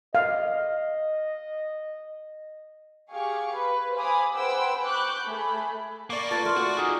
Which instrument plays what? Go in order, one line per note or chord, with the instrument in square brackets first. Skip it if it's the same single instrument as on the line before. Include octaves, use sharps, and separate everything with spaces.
[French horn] D#5 [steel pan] F5
[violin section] G4 G#4 F5 C#6
B4
C5 F5 G#5 B5 D6 D#6
G#4 B4 C5 F#5 G5 E6
B5 C#6 D6 F#6 G6
A3 G#4 B5
[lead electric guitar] A#3 [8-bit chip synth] D5 C#6 D6
[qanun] F4 A4 B4 [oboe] A5
[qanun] A3 A#4 [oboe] F4
[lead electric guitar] F#4 [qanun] A4
[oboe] D#4 [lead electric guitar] F#4 G#4